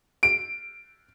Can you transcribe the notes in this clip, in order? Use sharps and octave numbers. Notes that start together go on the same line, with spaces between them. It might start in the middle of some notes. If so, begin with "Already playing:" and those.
D7